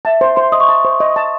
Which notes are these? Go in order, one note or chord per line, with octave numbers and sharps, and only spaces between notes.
E5 A5
C5
C5 C6
D#5 D#6
C#6
A5 D#6
C5
D#5
A5